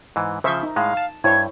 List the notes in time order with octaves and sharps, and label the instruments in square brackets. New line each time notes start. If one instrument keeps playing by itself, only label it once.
[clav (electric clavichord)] G#2 E3
[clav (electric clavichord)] C#3 F3 [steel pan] C5 E5 C#6
[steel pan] D#4
[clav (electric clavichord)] A2 G#3 [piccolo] F5
[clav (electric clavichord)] A5
[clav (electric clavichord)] G2 [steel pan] E4 C5 C#5 [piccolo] G#6